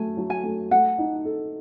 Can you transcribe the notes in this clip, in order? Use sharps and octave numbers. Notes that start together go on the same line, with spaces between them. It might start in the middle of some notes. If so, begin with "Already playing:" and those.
Already playing: F#3 A3 G#5
F#3
G#5
A3
A3 F#5
D#4
A4